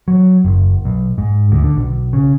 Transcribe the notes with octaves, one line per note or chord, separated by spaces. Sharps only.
F#3
F#1
B1
G#2
D2
D3
B1
C#3